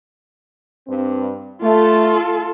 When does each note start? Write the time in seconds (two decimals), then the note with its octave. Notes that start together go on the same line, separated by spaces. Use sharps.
0.88 G2 C4
1.62 A3 F4 A4